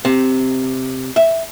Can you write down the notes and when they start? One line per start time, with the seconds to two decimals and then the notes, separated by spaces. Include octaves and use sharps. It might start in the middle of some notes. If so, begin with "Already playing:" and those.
0.05 C3
1.16 E5